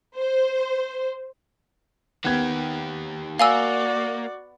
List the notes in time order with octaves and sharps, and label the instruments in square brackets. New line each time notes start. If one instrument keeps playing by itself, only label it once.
[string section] C5
[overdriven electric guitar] D#3 G4 [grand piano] B3 G#6
[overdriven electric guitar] A#3 [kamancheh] F#4 D5 [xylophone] F5 G#5 E6